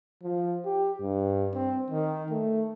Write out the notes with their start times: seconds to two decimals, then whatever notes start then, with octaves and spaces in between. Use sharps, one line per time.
0.23 F3
0.65 G4
1.01 G2
1.54 C4
1.90 D#3
2.31 A3